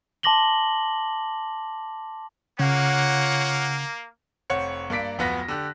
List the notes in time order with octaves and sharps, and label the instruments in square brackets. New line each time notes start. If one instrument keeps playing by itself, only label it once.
[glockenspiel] A5 C6 D6 A#6 F#7 G7
[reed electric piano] C#3 [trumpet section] A#3 [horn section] F4 C#5 F#5
[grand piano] F1 C4 C#5 F#5 C#7
G2 A#3 D5 B6 D7
D1 F2 B3 F#5 A#6 B6
D3 G4 F#6